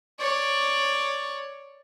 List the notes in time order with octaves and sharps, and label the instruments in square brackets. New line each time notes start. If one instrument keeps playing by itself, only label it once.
[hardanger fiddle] C#5 D5